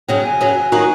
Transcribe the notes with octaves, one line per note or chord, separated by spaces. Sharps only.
F#2 C#3 F#3 G5
G#5
F#2 C#3 F#3
D#3 F#3 A#3 D#4 F#4